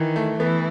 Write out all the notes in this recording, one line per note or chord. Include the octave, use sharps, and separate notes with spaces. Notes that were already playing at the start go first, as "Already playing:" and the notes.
Already playing: D#3 E3
A3
E3 B3